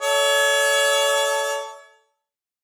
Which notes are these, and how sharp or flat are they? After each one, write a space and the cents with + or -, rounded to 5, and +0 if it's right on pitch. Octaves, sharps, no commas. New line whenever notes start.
A4 +0 C#5 +35 E5 -35